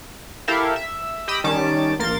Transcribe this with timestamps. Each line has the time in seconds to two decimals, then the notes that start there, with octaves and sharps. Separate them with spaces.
0.48 E4 G4 A4 A#4 E5 F5
0.76 E5
1.28 G4 D#5 G5 B5 D#6 E6
1.44 D#3 G3 C#4 A5 D6
1.99 A#1 A#3 A#4 C6 A6